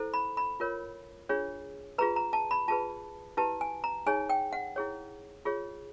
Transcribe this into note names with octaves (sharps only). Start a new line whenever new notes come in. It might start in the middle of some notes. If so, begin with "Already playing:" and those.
Already playing: E4 A4 C5
B5
B5
F4 A#4 C#5
D4 F4 G#4 C#5
F4 G#4 B4 A#5
A#5
A5
B5
F4 G#4 B4 A5
E4 G4 B4 A5
G#5
A#5
D#4 G#4 C#5 G#5
G5
F#5
E4 G#4 C#5
F4 G#4 C#5